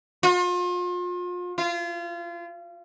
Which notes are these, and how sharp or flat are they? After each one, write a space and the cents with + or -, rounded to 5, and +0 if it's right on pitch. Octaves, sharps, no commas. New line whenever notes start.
F4 +35
F4 -30